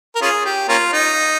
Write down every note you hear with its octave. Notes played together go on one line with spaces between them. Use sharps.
A#4
C#4 F4 G#4
G4
A#3 C#4 F4
D#4